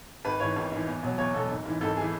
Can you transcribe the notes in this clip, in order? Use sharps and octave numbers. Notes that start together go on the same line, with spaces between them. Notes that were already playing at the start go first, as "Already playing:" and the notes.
G#1 B4
G#2 E3 C#5
G#1
G#2 E3
E2
B2 F#3
E2 C#5
B2 F#3 A4
G#1
G#2 E3
G#1 A4
E3 G#4